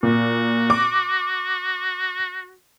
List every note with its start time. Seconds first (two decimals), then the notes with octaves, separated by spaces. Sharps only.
0.03 A#2 F#4
0.70 D6